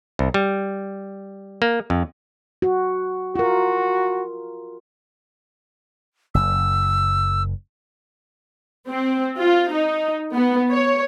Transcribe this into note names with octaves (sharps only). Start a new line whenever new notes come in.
C2
G3
A#3
F2
F#4
F4 F#4 A#4
F#1 F#2 E6
C4
F4
D#4
B3
C#5